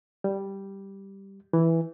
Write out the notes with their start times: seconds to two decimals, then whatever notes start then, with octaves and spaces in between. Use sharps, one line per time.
0.24 G3
1.53 E3